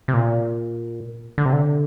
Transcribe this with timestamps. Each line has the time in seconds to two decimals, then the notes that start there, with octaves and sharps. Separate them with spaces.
0.08 C3
0.14 A#2
1.38 D3
1.46 C3
1.53 D3